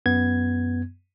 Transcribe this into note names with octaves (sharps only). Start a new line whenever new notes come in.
F#2 B3 G#6